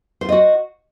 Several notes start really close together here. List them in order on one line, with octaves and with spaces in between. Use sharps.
C5 F4 D#5 F#4